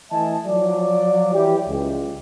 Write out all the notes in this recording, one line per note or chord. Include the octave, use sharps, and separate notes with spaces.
E3 A3 D#5 E5 G#5 A5
F3 F#3 D5
E3 G3 G4
C#2